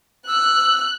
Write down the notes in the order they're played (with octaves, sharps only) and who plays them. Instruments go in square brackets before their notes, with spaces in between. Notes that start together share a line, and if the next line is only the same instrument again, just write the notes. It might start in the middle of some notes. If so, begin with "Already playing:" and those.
[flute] E6 [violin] F#6